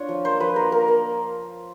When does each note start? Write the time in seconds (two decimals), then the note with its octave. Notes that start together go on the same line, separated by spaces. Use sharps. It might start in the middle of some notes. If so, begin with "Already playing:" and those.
Already playing: D4 F4 C#5
0.09 F3
0.25 A#3 C5
0.40 F3 B4
0.56 A#3 A#4
0.72 A#3 A#4
0.88 A#3